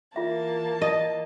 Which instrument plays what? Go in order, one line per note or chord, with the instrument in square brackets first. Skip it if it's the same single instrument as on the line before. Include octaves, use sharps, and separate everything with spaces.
[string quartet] E3 A#3 A5 [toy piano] F4 E5
[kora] D#5